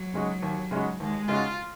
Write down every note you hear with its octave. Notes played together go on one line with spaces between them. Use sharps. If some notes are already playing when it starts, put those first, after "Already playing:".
Already playing: F#3
C#3 G#3 D#4 F#4
D#2
C#3 G#3 D#4 F#4
D#2 G#3
C#3 G#3 D#4 F4 F#4